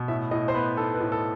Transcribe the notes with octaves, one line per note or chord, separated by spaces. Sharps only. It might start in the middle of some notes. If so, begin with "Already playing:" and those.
Already playing: B2
A2 E5
A2 D#5
C5
B3 B4
D#4 A4
B4
A2
A4